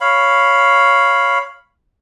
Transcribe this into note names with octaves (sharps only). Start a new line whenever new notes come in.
C#5 F5 B5